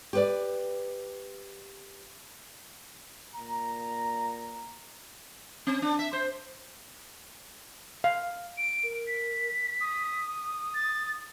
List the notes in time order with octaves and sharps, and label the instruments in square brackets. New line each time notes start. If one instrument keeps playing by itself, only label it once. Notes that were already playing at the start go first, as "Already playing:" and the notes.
[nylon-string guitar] G4 B4 D5
[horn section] A#2 A#5
[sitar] C4
D4
E5
C5
[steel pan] F5
[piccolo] D7
[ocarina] A#4
[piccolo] B6
[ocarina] D#6
[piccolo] A6